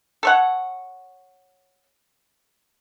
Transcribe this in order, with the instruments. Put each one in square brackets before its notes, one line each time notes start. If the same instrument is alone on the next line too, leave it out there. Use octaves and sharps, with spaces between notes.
[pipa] A4 C#5 F#5